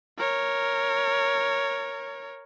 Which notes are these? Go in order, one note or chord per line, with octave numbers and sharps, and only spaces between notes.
A#4 C#5